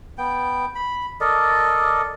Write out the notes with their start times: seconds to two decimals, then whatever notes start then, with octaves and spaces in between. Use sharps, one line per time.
0.18 B3 G5
0.75 B5
1.21 A4 A#4 D5 D#5